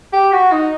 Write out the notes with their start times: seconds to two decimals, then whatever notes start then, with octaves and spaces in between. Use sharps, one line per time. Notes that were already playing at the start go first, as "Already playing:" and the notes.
0.13 G4
0.32 F#4
0.52 D#4